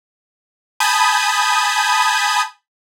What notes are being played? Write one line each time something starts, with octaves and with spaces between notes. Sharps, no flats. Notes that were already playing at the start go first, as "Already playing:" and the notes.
G#5 A5 B5 D#6 G6 G#6